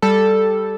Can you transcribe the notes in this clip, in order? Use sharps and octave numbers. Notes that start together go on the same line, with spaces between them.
G3 A4